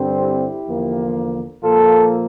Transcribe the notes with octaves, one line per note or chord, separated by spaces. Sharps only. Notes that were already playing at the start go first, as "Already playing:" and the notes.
Already playing: G2 D3 G3 C4
E4 G4
E2 D3 F3 A#3
A#2 F3 A#3 F4 A4